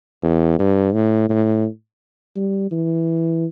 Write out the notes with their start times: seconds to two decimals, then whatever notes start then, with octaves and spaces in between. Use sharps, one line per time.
0.23 E2
0.59 G2
0.94 A2
1.29 A2
2.36 G3
2.72 E3